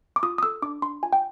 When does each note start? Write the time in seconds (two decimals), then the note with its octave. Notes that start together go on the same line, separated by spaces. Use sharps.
0.16 D6
0.23 F4 D#6
0.38 D#6
0.43 A4 E6
0.62 D4 D6
0.82 D4 C6
1.03 F4 G#5
1.13 G5